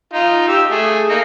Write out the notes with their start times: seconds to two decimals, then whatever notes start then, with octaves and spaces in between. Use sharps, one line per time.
0.13 D#4 F4
0.48 G4 E6
0.71 A3 G#4
1.09 A#3 D#4